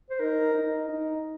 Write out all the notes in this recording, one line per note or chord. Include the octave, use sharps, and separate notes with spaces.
C5
D#4 A#4
D#4
D#4